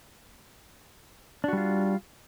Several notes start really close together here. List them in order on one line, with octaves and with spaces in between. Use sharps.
D4 F#4 G3 F4